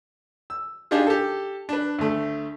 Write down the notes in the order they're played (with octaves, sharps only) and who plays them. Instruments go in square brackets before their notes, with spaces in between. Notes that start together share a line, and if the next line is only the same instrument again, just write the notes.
[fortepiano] E6
D4 D#4 F4 G4 G#4
G4 A4
D4 B4
D2 A3